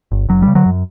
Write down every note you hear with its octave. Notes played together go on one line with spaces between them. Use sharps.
G1
F#1 F#3
G3
C#3
D3 F#3
F#2